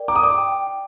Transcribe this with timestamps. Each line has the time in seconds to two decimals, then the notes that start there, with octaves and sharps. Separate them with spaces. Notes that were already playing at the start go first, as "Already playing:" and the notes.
Already playing: A#4 D5 G5
0.08 A#5 D6
0.16 D#6
0.23 D5 D6
0.38 G5
0.52 G5
0.67 G5